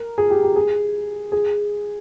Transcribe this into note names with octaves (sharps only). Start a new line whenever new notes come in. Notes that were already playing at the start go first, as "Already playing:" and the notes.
Already playing: A#4
G#4
G4
G4
G#4
G#4